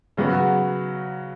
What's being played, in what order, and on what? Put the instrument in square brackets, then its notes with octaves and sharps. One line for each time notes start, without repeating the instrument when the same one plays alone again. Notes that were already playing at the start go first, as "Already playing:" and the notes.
[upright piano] C#3 F#3 B3 F#4